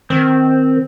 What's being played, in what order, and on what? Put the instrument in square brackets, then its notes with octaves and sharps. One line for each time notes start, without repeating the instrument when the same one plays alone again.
[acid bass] D#3 [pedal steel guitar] C4